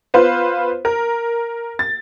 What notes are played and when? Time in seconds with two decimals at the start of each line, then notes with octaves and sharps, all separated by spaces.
0.14 B3 F4 B4 C5
0.85 A#4
1.79 A6